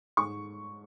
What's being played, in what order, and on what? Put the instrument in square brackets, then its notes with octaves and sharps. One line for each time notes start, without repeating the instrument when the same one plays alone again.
[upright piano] G#2 C#6